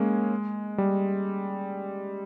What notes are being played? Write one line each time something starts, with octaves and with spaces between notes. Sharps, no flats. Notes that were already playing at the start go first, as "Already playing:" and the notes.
Already playing: G#3 A#3 C#4
G3